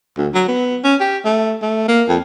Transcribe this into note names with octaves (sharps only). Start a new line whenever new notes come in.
D2
F#3
B3
C#4
G4
A3
A3
A#3
F2